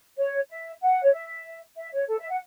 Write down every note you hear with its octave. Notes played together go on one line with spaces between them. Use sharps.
C#5
E5
F#5
C#5
E5
E5
C#5
A4
E5
F#5